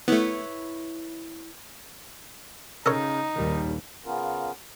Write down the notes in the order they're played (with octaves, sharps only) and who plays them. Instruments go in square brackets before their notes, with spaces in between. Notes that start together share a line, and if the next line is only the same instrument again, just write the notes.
[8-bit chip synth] A3 B3 [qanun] E4 B4 C#5
[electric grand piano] C#3 [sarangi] D#4 [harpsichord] A4 A#4 C#5
[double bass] A#1 D#2 [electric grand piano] D#3 G3
[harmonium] C#3 B3 C#4 F4 A#4